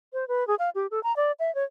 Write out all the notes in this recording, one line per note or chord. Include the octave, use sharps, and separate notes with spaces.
C5
B4
G#4
F5
G4
A4
A#5
D5
E5
C#5